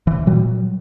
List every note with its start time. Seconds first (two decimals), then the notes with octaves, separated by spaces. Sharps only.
0.07 E3
0.26 A#2 F#3 G3